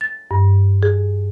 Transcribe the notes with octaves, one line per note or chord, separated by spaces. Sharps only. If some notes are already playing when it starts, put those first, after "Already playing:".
A6
G2
G#4